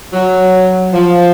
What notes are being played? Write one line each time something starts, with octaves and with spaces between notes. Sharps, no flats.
F#3
F3